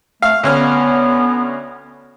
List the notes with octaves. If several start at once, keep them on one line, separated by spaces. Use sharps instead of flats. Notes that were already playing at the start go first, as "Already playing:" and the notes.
A3 F5
D2 B3 C#4 F6